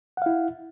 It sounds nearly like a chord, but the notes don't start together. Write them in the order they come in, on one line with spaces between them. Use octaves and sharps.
F#5 F5 E4